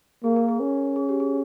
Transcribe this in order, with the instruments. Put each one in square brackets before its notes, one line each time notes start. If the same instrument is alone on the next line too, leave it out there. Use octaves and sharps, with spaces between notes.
[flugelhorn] A#3 [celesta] G#4
[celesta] A#4
G#4
[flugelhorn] C#4
[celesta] G#4
G4
G#4